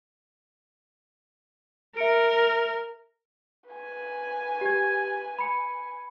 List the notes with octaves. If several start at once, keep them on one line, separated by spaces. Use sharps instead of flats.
A#4 E5 C#7 D7
B4 G#5
G4 G#6
B5 C#7